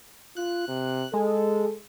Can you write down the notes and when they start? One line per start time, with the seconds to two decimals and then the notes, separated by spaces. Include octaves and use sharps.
0.37 F4 F#6
0.68 C3
1.14 G#3 A4